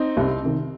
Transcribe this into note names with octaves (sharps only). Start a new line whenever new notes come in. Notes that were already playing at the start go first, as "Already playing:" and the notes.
Already playing: C4 D#4
C2
C3 D#3